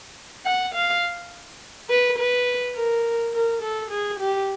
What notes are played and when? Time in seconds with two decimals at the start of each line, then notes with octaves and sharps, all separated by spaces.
0.45 F#5
0.75 F5
1.90 B4
2.18 B4
2.75 A#4
3.33 A#4
3.62 A4
3.91 G#4
4.20 G4